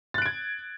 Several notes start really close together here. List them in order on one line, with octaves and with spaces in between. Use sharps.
A6 F#6 D7 G#6